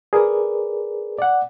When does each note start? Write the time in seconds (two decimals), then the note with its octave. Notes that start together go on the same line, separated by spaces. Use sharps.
0.13 G#4 A#4 B4 D5
1.19 D5 F#5